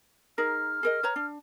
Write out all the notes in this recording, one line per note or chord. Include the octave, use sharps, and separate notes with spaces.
D#4 G#4 A#4 F6
G#4 A#4 D#5
B4 C#5 A#5
D4